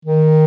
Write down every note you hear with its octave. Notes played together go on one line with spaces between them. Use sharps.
D#3